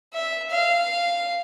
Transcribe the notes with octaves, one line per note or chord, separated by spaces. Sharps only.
E5
F5